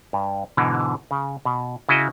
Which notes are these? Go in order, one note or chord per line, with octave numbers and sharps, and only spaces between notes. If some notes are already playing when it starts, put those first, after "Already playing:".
G2
G#2 B2 D3 E3
C#3
B2
C#3 E4 F#4 D#5